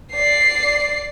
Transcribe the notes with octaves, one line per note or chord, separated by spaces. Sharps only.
D5 C7